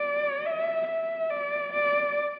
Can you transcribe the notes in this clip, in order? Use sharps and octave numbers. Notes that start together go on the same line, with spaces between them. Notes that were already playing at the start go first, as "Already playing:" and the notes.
Already playing: D5
E5
E5
D5
D5